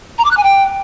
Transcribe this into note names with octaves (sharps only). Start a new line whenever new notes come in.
A#5
D6
F#6
G#5
G5